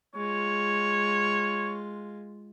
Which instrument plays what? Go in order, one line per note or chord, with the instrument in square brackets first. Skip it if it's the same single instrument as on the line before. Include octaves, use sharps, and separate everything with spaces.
[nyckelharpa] G#3 F4 [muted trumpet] C#5